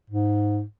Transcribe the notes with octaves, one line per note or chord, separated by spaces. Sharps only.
G#2